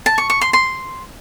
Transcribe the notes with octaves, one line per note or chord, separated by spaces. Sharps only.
A5
C#6
C#6
C6
C6